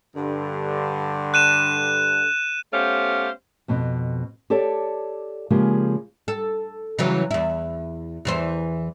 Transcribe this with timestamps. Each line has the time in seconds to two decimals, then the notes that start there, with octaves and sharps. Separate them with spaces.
0.15 G2 D3
1.34 F#6 D#7 E7
2.73 A3 B3 C#4 G4 C5 F5
3.68 F2 B2 C4
4.50 G4 A4 C#5 D5
5.50 C#3 F3 G#3 A#3 G4 G#4
6.28 A4
6.99 C#3 E3 F#3
7.31 E2 E4
8.25 E2 E3 C5